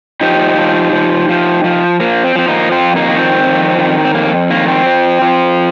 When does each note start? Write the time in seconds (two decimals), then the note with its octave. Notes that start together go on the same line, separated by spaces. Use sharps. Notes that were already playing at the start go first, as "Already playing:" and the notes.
0.21 F3 D#4 G4
0.58 F3
0.93 F3
1.29 F3
1.64 F3
2.00 F3 A#3
2.24 C4
2.36 F3 C4
2.48 A#3 D#4
2.71 F2 C4 F4
2.96 A#3 D#4
3.08 D#3
3.19 C4
3.43 F2
3.78 D#3
4.05 C4
4.14 F2 A#3
4.50 D#3 A#3
4.68 C4
4.86 F3
5.22 F3